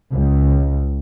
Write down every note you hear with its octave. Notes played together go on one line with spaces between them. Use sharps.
C#2